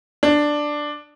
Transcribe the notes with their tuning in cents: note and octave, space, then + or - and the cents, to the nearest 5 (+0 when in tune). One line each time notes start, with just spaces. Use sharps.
D4 +5